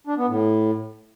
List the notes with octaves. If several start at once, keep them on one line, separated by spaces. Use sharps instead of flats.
D4
B3
A2